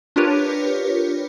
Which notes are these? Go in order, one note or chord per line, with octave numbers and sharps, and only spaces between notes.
D4 F4 G4 A#4 B4 C#5